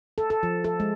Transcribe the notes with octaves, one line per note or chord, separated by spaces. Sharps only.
A4
A4
F3
A4
G#3